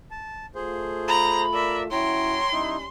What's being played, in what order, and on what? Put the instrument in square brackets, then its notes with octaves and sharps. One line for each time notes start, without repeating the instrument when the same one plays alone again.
[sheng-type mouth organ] A5
[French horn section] A3 F4 [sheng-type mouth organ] G#4 C5
[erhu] A#5 [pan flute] B5
[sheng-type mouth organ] A#4 D5 [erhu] E5
[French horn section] F#3 C#4 E4 [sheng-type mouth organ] C#5 A#5 [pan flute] G5 [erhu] C6
[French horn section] G3 C#4 [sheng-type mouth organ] D#4 E4